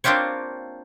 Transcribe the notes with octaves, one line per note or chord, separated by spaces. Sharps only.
A#3 C4 D4 F4 G4 C#5